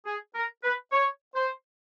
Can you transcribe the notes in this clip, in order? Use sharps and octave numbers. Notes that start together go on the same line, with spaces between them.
G#4
A#4
B4
C#5
C5